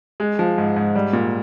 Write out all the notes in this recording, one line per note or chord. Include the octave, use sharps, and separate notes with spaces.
G#3
F3
G#2
G#2
G3
A#2